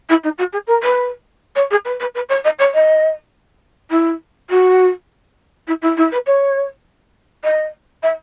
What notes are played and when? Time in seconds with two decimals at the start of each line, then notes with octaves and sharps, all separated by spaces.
0.09 E4
0.23 D#4
0.38 F#4
0.52 G#4
0.67 A#4
0.82 B4
1.55 C#5
1.70 G#4
1.84 B4
2.00 B4
2.14 B4
2.29 C#5
2.44 D#5
2.58 C#5
2.73 D#5
3.90 E4
4.49 F#4
5.67 E4
5.81 E4
5.96 E4
6.11 B4
6.26 C#5
7.44 D#5
8.02 E5